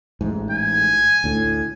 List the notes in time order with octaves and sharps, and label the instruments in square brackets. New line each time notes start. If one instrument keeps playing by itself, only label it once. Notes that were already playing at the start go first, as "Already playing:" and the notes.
[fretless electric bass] A1 G#2
[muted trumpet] G#5
[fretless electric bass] D2 A2